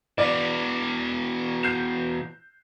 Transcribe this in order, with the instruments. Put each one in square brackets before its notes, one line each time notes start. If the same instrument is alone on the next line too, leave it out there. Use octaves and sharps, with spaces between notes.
[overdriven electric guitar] B2 E3 [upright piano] D5 D6
[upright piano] G6 C7 E7